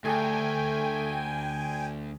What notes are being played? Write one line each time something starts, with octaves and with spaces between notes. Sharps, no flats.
D2 A3 G4 G#4 G5 G#5